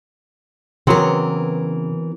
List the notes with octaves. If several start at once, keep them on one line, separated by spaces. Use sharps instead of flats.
C#3 E3 F#3 B3 C4 A#4